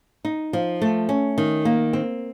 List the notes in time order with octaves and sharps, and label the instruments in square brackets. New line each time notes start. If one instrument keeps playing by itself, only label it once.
[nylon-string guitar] D#4
F3
A3
C#4
D#3
A#3
C4